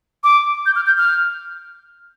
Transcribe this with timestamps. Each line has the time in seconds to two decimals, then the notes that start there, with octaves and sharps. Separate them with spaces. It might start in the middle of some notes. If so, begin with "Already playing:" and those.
0.24 D6
0.66 G6
0.76 F6
0.86 G6
0.98 F6